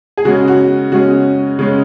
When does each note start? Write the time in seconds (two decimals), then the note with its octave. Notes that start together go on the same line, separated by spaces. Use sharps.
0.17 G#4
0.25 C#3 G#3 C#4 F#4
0.48 F#4
0.92 C#3 G#3 C#4 F#4
1.59 C#3 G#3 C#4